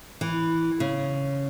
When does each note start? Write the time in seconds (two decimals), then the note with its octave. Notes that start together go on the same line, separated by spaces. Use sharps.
0.21 E3
0.80 C#3